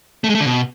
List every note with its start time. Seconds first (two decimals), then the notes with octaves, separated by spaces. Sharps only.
0.24 A3
0.29 G#3
0.35 A3
0.40 D3
0.46 B2